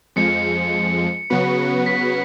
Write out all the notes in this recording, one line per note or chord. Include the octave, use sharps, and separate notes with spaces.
F2 F3 G#3 C#7
C#3 F#3 B3 F#4 B4
B6